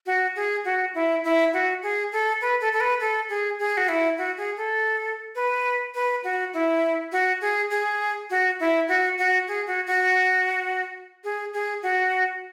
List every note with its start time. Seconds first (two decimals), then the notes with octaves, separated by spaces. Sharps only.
0.06 F#4
0.36 G#4
0.65 F#4
0.95 E4
1.24 E4
1.53 F#4
1.83 G#4
2.12 A4
2.41 B4
2.61 A4
2.73 A4
2.81 B4
3.00 A4
3.29 G#4
3.59 G#4
3.77 F#4
3.89 E4
4.18 F#4
4.37 G#4
4.57 A4
5.35 B4
5.95 B4
6.24 F#4
6.53 E4
7.12 F#4
7.41 G#4
7.71 G#4
8.30 F#4
8.60 E4
8.88 F#4
9.18 F#4
9.48 G#4
9.67 F#4
9.87 F#4
11.24 G#4
11.54 G#4
11.83 F#4